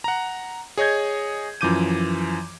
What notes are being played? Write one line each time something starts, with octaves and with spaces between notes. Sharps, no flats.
F#5 A#5
G#4 C#5 D#5 G6 G#6
F#2 E3 F3 D6 G6 D#7